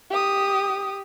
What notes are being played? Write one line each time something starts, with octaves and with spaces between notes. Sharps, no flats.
G4 D#6